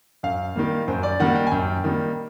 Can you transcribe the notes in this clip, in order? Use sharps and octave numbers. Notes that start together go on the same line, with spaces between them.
F#2 F5
D#3 G3 A#3
F#2 C5
D5
D#3 G3 A#3 F#5
G5
G#5
F#2 G5
D#3 G3 A#3